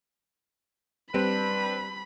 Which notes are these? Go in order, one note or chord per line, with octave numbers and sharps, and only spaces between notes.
G3 C4 D4 B4 B5